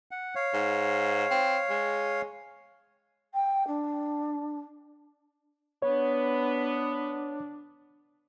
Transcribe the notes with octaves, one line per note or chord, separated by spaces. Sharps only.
F#5
C#5 F5
G#2
C4
G#3
G5
D4
B3 D4 C#5